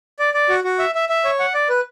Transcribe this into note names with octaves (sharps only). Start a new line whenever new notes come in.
D5
D5
F#4
F#4
E5
E5
E5
C#5
F#5
D5
B4